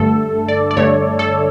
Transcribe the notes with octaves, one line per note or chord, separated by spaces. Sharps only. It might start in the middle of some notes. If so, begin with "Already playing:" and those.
Already playing: G2 D3 A3 A4
D5
D5
G2 D3 A3 C#5
A4